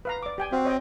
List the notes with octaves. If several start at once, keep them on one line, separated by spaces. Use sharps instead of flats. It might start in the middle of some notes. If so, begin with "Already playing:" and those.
B4 F5 A#5
D5 D6
G4 G5 G#5
C4 F#4 F5
C#5 D#5 G5